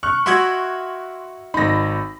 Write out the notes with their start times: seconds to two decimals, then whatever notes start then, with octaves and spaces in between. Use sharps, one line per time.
0.03 C#6 F6 F#6
0.26 E4 F#4 D#5 C6 E6 G#6
1.54 G#1 D#4 B5 A#6